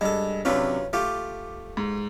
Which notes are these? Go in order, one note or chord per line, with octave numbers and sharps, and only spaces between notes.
G2 G#3 A4
F#2 C3 C#4 D4 F4 B4
A3 F4 G4 D6
G#2